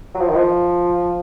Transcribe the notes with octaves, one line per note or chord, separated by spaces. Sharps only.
F#3
F3
D#3
F3